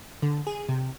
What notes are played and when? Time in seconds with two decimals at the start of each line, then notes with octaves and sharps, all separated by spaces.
0.22 D3
0.47 G#4
0.69 C3